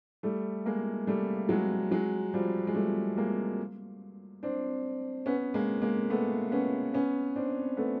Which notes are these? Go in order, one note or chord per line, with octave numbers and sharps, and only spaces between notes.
G3 A3
G#3 A#3
G3 A3
F#3 G#3
F#3 G#3
F3 G3
G#3
G3 A3
G#3 A#3
C4 D4
B3 C#4
G#3 A#3
G#3 A#3
A3 B3
B3 C#4
B3 C#4
C4 D4
A3 B3